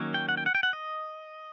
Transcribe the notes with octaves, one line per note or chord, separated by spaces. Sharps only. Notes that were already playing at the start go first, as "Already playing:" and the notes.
Already playing: D#3 F#3 A#3 C#4
G5
F#5
G5
F#5
G5
F#5
D#5